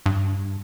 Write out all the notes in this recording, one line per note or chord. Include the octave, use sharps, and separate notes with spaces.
G2